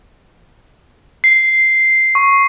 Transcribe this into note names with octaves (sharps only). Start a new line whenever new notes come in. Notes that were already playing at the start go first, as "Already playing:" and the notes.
C7
C#6